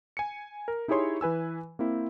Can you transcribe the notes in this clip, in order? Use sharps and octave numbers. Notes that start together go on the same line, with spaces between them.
G#5 C#7
A#4
D#4 E4 G4 G#4 C#5 C6
E3 B4 G#5 E6
A#3 C4 E4